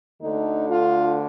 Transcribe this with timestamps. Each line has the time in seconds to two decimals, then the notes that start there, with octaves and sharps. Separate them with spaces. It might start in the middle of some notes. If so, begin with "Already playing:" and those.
0.22 D2 D3 A3 D#4
0.68 F4